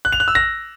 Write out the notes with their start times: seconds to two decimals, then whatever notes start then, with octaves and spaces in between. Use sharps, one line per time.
0.05 F#6
0.12 F7
0.20 F#6
0.28 E6
0.35 A#6